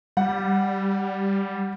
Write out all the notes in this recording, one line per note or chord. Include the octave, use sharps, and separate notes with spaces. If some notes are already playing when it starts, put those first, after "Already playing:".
G3 F#5